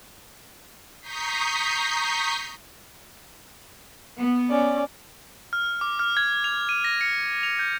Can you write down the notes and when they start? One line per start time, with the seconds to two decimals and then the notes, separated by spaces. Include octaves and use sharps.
1.00 A#5 C#6 D#6 G6 B6 C7
4.19 B3
4.50 C#4 D5
5.53 F6
5.81 D6
5.99 F6
6.17 G#6
6.44 F7
6.69 D#7
6.84 A#6
7.01 C#7
7.43 F7
7.59 G6